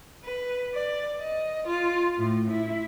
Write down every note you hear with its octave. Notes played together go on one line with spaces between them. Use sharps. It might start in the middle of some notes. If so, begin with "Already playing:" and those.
B4
D5
D#5
F4
A2
E4